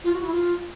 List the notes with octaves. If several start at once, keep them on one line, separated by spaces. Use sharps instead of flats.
F4
F#4
E4
F4